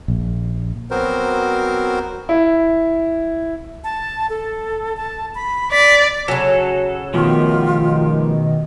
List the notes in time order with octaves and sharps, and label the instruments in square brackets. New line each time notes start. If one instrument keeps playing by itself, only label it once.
[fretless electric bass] A#1
[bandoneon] F#3 B3 C4 F#4 A#4 C5
[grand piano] E4
[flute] A5
A4
A5
B5
[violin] D5 [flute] B6
[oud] C#3 F#3 [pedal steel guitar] A4 [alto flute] G#5
[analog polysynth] B2 D#3 [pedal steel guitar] F3 A3 G4 [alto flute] F4